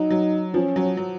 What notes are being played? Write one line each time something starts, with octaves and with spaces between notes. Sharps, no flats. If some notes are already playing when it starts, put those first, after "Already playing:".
Already playing: F#3 D#4
F#3
F3 C#4
F#3
F#3